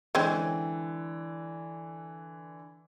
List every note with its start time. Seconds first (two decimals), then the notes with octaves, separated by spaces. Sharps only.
0.15 D3 E3 G#3 C4 C#4